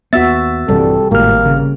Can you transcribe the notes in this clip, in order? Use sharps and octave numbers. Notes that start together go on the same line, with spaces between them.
D#2 B3 F#4 E5 E6 A6
A#1 G2 C3 E3 G3 A4
G#1 A2 G#3 A#3 F6
C#3